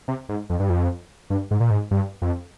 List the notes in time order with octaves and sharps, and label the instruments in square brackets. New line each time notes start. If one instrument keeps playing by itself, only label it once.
[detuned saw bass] C3
G#2
F2
G2
F2
G2
G#2
A#2
G#2
G2
F2